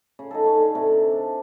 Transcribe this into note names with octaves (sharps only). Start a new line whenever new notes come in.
C#3
D#4 G#4 A4
C#5 F5
D3
C3
D4